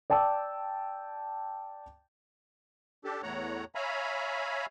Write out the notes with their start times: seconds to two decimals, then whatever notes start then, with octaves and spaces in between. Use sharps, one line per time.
0.10 D5 G5 A5 D6 E6
3.05 D4 G4 A4
3.23 E2 A2 A3 C#5 F#5 A#5
3.75 C#5 E5 F5 G#5 A#5 B5